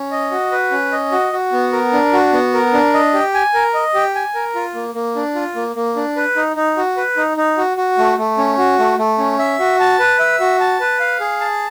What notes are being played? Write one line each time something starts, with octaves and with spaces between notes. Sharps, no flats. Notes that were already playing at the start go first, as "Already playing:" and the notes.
Already playing: C#4
D#5
F#4
B4
C#4
D#5
F#4
F#4
B3
A#4
D4
F#4
B3
A#4
D4
D#5
G4
G#5
A#4
D#5
G4
G#5
A#4
F4
A#3
A#3
D4
F4
A#3
A#3
D4
B4
D#4
D#4
F#4
B4
D#4
D#4
F#4
F#4
A3
A3
C#4
F#4
A3
A3
C#4
E5
F#4
A5
B4
E5
F#4
A5
B4
F5
G#4
A5